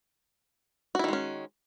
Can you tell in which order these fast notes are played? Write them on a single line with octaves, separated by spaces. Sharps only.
F#4 E4 D#3 G#3 C#4